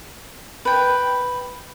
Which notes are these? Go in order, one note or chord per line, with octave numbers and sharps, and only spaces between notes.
B4 G5